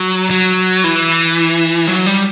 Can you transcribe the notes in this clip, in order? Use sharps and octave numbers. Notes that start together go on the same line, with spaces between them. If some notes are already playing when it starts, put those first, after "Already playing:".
Already playing: F#3
F#3
E3
F#3
G3